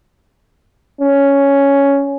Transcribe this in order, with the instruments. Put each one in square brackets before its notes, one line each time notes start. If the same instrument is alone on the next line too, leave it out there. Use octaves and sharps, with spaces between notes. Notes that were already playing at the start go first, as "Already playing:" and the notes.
[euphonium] C#4